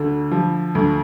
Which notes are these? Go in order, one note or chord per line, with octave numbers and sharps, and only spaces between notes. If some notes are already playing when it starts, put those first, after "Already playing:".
Already playing: D2 D3
F3
D2